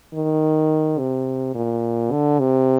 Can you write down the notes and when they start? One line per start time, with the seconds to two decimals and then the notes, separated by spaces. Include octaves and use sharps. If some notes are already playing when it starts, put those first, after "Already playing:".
0.14 D#3
0.98 C3
1.55 A#2
2.12 D3
2.39 C3